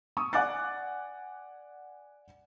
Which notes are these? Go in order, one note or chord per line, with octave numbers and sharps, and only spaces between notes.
C#6 D#6 E6
D5 F#5 G#5 D6 F#6 A6